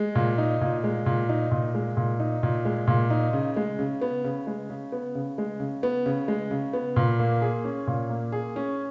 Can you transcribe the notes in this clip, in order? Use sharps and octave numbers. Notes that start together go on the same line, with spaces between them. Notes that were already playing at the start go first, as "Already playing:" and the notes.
Already playing: G#3
A#2
D#4
A#2
G#3
A#2
D#4
A#2
G#3
A#2
D#4
A#2
G#3
A#2
D#4
C#3
G#3
C#3
B3
C#3
G#3
C#3
B3
C#3
G#3
C#3
B3
C#3
G#3
C#3
B3
A#2
A#3
G#4
C#4
A#2
A#3
G#4
C#4